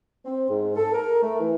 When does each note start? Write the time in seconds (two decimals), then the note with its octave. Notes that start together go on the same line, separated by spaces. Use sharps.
0.24 C4
0.49 G#2
0.75 A4
0.93 A#4
1.22 A3
1.39 E3